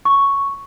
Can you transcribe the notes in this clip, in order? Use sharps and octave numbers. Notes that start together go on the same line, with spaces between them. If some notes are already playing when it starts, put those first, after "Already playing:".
C#6